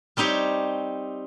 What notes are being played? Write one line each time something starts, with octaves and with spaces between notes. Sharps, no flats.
G3 C4 D#4 G4 C#5